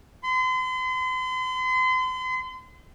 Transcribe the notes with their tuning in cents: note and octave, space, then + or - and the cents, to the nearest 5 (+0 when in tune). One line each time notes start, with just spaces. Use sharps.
C6 -40